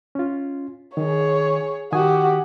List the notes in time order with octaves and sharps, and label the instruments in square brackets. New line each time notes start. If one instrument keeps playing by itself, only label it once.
[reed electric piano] C#4 F4
[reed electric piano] D#3 [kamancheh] G#4 C#5
[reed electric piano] D#3 G#5 D#6 [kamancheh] F#4 G4